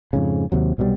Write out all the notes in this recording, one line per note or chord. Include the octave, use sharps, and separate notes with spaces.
F2 G#2 C#3
D#2 C3 F#3
C2 B2 F#3 G3